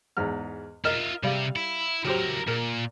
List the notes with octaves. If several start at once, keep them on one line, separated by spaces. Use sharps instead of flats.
E2 G#2 F6
F4 A#4 D#5 E5 F6
C3 G3 F5
E4
F#3 E4 G4 A#4 C5
A#2 A#4